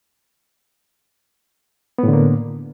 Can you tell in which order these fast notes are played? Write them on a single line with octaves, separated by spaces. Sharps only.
B3 A2 D3 A#3